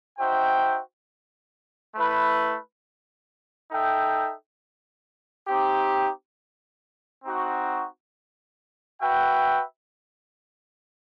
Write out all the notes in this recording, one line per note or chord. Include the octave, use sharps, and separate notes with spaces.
D#4 F#4 C5 E5 G5
A3 E4 B4
D#4 A4 E5 G5
C4 D#4 G4
C4 D#4 F#4
F#4 B4 E5 G5